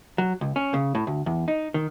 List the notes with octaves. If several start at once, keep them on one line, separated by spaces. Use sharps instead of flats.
F#3
C#2
C#4
C#3
A2
D2
E2
D#4
D#3